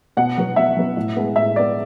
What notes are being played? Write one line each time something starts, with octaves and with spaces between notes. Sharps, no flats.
B2 F#5
F#3 B3
B2 E5
F#3 B3
A2
G#3 B3
A2 E5
G#3 B3 D5